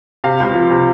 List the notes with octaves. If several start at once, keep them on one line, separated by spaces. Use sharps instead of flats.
C3 F5
C#2
F3
C3